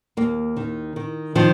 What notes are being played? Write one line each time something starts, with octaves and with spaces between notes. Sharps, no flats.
D#2 A#3
D#3
D#3
D#3 F3